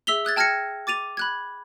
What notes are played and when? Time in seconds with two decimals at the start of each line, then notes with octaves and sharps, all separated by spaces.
0.07 G#4 E5 E6 B6 F7 G7
0.25 D#6 F#6 G#6 A6
0.36 G5 A5 F6 G#6 A#6 C#7
0.87 D6 A6 D#7 F7
1.17 B5 F#6 G#6